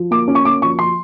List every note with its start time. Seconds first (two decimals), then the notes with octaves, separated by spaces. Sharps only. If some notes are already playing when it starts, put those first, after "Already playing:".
Already playing: F3
0.11 A#3 D6
0.28 C#4
0.35 C#6
0.45 A#3 D6
0.62 F3 C#6
0.79 F3 C6